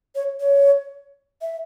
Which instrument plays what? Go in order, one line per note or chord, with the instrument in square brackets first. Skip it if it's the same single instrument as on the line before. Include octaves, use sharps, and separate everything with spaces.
[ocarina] C#5
C#5
E5